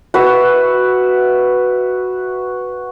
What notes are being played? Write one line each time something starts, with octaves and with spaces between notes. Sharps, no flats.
F#4 B4 E5